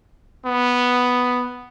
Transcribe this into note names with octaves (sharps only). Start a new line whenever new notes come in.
B3